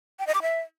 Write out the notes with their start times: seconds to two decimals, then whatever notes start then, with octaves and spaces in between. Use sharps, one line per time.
0.19 G5
0.27 D#5
0.35 D6
0.42 E5